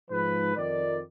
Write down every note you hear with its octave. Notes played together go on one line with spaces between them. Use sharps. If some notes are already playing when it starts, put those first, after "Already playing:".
G#2 F3 B4
F2 D#3 D5